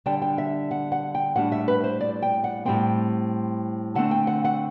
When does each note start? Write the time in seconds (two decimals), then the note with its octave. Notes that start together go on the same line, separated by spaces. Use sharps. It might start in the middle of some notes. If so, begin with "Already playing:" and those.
0.06 D3 G3 D4 G5
0.22 G5
0.38 E5
0.71 F#5
0.92 F#5
1.14 G5
1.36 A2 G3 D4 F#5
1.52 E5
1.68 B4
1.84 C5
2.01 D5
2.22 G5
2.44 F#5
2.65 A2 G3 C4 G5
3.95 D3 A3 C4 F#5
4.11 G5
4.27 F#5
4.44 F#5